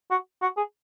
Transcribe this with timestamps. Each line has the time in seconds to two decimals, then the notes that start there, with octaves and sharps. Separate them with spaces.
0.11 F#4
0.42 F#4
0.57 G#4